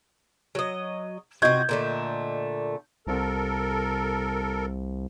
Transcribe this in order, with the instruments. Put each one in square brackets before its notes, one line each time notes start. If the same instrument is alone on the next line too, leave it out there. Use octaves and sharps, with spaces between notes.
[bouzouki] F#3 D#5
[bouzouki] C3 F#4 [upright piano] D#5 G6 G#6
[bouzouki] A#2 D3 A3
[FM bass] C2 [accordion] A4 A#4